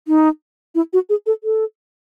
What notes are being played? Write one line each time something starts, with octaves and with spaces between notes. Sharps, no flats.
D#4
E4
F#4
G#4
A4
A4